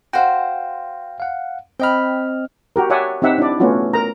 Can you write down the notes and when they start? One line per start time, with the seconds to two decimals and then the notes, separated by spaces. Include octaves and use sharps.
0.13 F#4 C5 F5 G5
1.20 F5 F#5
1.80 C4 D#5 G5 B5 F6
2.76 F#4 G4 A#4
2.90 C#5 D5 E5 F#5 G#5
3.22 C4 D#4 G4 E5 F#5
3.38 D4 E4 D5
3.60 A3 B3 C#4 F4 F#4
3.93 A#4 A#5